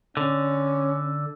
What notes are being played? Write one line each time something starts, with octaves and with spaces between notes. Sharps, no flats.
D3 C#4